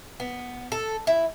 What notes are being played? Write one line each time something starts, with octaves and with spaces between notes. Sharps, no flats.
B3
A4
E4